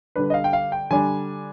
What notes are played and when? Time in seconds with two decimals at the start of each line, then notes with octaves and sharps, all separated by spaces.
0.16 D3 G3 D4 B4
0.30 D#5
0.34 F5
0.44 G5
0.53 F5
0.72 G5
0.91 D3 G3 D4 G#5